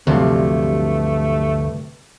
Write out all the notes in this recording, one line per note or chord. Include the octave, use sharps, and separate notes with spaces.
D2 G2 C3 F3 F#3 A3